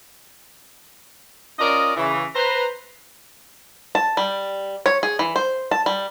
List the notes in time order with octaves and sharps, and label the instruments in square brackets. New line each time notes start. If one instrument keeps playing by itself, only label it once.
[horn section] C#4 F4 A#4 D5 D#5
C#3 E3
B4 C5 A#5
[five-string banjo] A5
G3
C#5
G#4
E3
C5
A5
G3